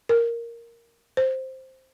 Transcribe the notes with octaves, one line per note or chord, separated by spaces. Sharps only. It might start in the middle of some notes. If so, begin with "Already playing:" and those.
A#4
C5